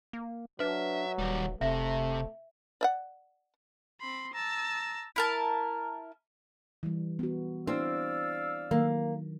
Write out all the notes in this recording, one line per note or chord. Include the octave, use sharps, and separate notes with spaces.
A#3
F#3 D4 B4 E5
D#1 D#3 G3
F1 C3 A3 E5
D5 E5 F#5
C4 B5 C6
A5 A#5 E6
E4 A#4 A5
E3 G3
B3 F#4
C4 D4 E4 D5 F5 E6
D#3 F#3 A#3